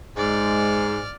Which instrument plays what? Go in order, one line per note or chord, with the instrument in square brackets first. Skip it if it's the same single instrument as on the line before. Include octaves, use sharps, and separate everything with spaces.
[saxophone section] G#2 [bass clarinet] G#3 [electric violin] D5 F6